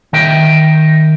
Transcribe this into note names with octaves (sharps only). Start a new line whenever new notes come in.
D#3 A#4 E5 G5